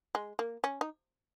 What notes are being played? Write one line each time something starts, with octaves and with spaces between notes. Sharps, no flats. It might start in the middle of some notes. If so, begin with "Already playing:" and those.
G#3
A#3
C#4
D#4